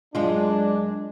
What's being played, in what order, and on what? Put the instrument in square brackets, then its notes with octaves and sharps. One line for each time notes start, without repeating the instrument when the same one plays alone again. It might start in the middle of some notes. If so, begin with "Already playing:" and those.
[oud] F#2 G#3 F4 [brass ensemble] D4